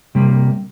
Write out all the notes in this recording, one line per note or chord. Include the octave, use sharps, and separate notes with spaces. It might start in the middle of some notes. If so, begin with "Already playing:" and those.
C3 G3 A#3